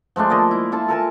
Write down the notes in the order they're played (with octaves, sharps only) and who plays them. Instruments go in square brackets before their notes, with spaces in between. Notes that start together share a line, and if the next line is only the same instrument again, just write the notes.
[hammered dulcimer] F3 G#3 A3 D4
A#3 D5 D#5 C6
E4
F4 A4 E5 A5
A4 A#4 G#5 A5